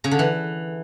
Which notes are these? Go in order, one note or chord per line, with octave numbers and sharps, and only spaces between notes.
C#3
D3
E3